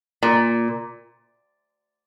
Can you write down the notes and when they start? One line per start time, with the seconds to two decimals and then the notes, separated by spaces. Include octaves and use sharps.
0.23 A#2